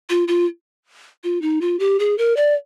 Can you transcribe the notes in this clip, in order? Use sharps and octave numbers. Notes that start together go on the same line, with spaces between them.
F4
F4
F4
D#4
F4
G4
G#4
A#4
D5